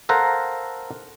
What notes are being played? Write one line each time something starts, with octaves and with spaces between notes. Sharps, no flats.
A4 A#4 C5 F5 F#5 A#5